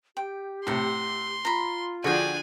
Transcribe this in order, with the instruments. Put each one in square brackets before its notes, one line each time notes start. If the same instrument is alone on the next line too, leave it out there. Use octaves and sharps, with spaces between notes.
[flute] G4 [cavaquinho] G5
[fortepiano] A2 C3 [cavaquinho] E5 F#5 [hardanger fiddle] C6
[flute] F4 [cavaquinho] A#5 B5
[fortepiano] D3 F3 G#4 [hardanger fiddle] D4 G#5 [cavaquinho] F#4 G5